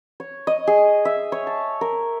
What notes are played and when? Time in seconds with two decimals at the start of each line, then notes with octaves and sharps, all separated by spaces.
0.20 C#5
0.47 D#5
0.67 G#4
1.05 E5
1.32 C#5
1.47 A5
1.81 A#4